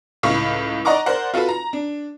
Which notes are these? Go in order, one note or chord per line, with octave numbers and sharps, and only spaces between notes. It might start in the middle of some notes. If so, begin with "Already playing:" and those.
C#2 A2 F5 B5 C#6
D5 D#5 F#5 A#5 C#6 D6
A#4 C5 D5 F#5
F4 F#4 A4 B4
A#5
D4